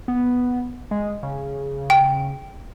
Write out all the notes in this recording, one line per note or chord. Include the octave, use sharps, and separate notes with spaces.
B3
G#3
C#3
G5